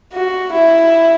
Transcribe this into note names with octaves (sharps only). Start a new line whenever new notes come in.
F#4
E4